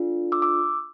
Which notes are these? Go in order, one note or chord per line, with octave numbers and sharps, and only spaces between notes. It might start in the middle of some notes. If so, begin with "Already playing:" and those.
Already playing: D4 F4 A4
D6 E6
D6 E6